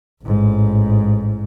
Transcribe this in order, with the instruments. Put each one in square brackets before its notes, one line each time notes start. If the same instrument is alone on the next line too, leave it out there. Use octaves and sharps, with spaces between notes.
[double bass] A1 G#2